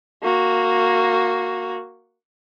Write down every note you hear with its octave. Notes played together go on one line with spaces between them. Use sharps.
A#3 F#4